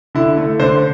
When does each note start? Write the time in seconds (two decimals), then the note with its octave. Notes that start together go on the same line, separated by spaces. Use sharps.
0.15 D3 E4
0.37 A3
0.59 D3 C5